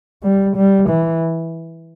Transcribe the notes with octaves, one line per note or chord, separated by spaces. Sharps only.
G3
G3
E3